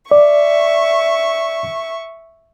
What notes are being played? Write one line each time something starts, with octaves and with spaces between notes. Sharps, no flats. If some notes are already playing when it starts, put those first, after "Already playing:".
D5 E5 C#6